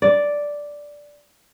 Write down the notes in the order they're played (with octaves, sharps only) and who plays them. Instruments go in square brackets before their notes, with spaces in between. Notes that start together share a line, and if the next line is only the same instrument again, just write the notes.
[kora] D5